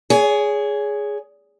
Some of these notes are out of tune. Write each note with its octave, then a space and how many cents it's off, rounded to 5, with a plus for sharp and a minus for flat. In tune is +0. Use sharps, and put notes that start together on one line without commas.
G#4 +0 C#5 +35